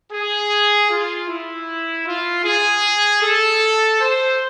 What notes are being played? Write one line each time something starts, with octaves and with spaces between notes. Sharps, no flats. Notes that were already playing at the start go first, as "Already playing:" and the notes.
G#4
F4
E4
F4
G#4
A4
C5